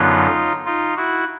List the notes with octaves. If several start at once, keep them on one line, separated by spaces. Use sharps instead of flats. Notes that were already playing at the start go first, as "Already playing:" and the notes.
Already playing: F#2 D3 F#3 B3 D#4 F4
D#4 F4
E4 F#4